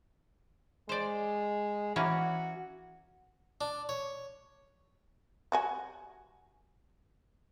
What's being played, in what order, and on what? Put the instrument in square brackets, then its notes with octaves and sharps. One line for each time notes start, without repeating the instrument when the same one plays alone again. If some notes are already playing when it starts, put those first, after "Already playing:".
[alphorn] G#3 [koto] C5 D5
[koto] E3 A#3 C#4 [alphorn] F#4
[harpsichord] D4
C#5
[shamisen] G3 F#4 G#5